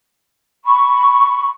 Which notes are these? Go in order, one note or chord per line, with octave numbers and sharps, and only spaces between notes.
B5 C#6